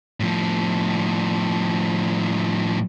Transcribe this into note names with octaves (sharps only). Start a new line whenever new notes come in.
A2 F3